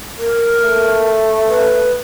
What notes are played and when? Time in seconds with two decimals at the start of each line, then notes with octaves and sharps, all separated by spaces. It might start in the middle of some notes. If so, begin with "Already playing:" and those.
0.19 A#4
0.60 A3
1.48 B4